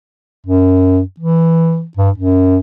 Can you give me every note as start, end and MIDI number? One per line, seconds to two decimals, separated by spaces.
0.46 1.00 42
1.20 1.85 52
1.97 2.10 43
2.18 2.57 42